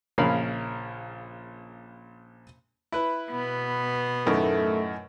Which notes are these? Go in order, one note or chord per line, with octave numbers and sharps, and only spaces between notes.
A#1 C#3 C#4 A#4 F5 B5
E4 B4
B2 B3
F#2 A2 D#3 A3